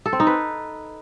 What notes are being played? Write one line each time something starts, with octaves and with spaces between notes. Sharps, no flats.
A4
C4
D#4
B4